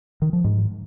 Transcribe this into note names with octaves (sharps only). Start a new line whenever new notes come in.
D#3
F3
G#2